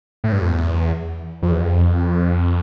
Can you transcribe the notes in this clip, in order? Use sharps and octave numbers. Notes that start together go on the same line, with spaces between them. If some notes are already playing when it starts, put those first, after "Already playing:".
A2
G2
F2
E2
F2
E2
F2